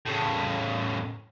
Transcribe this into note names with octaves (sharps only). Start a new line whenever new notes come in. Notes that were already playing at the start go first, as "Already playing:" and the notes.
A2 C#3